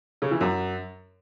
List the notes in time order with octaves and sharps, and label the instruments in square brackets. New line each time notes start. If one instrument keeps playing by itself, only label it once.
[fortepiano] C#3
E3
F#2